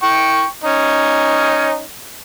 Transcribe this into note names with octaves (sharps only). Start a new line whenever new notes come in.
G5 C#6
C#4 D#4